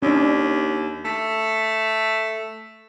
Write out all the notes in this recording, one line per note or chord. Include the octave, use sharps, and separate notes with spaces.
D#2 C#4 D4
A3